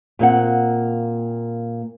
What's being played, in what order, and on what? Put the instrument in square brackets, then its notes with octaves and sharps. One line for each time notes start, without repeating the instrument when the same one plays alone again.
[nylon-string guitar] A#2 A#3 C4 F#5